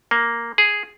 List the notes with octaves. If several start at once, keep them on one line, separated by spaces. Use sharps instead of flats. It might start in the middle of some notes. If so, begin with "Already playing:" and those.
A#3
G#4